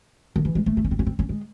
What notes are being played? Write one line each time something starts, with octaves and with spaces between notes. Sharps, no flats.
D#3
E3
G#3
A3
C4
C#4
C4
C#4
C4
C#4
G#3